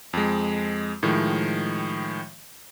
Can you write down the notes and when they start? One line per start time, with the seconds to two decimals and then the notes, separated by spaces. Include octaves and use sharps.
0.13 F2 G#3
1.03 A2 D#3 F3 G#3